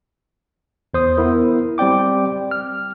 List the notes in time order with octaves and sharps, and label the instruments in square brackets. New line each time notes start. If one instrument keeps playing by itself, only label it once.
[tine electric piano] E2 C5 D#6
B3 E4 A#4
G3 C4 D5 G5 D6
F6